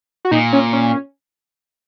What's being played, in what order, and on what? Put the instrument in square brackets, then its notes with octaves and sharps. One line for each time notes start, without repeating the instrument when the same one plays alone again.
[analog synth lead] F#4
[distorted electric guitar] A#2 [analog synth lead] D#4
[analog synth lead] C#4
C#4